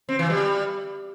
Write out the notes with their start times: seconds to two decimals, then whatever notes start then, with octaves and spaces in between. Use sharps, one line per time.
0.09 C4
0.19 E3
0.30 G3